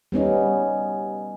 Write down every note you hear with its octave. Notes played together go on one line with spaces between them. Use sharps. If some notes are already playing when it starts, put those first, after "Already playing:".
G3 B3 C#4 D#4